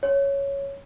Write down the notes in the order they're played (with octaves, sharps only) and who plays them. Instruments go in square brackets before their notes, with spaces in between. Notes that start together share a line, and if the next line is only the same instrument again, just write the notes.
[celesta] C#5